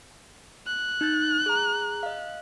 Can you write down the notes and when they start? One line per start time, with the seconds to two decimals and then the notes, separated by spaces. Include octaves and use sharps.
0.66 F#6
1.01 D#4 G6 A6
1.46 G#4 A#5
2.03 D#5 F5